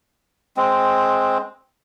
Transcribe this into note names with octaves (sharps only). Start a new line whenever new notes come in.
G#3 C4